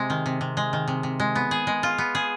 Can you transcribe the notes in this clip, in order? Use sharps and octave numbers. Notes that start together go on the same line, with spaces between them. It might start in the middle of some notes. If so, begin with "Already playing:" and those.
Already playing: C3 G#3
D#3
C3
C3
G#3
D#3
C3
C3
G#3
B3
G#4
G#3
F4
B3
G#4